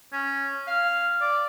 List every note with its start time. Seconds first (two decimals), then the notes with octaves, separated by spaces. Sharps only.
0.12 C#4
0.67 F5
1.21 D5